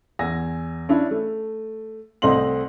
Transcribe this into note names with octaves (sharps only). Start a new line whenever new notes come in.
E2 G#5 E6 A#6
C#4 D4 E4
A3
C2 A3 C4 D#5 C6 F#7